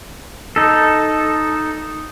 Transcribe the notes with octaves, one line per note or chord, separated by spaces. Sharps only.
D#4 A4